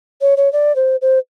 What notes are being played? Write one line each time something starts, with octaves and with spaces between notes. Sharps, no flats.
C#5
C#5
D5
C5
C5